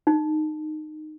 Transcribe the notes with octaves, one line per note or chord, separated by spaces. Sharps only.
D#4